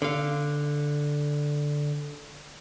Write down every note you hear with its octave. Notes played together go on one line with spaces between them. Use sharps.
D3 F5